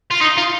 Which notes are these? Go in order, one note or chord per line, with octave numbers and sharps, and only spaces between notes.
F4
D#4
F4